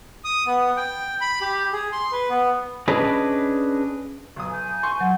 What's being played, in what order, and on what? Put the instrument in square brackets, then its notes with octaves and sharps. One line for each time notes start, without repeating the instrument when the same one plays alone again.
[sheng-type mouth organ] D#6
B3
G5
B5
G4
G#4
C6
B4
B3
[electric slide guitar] C#4 D4 G#4 B4 C#5 D#5
[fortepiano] B1 D#6
[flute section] G#5 G6
[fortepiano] C6 C#6
[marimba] F#3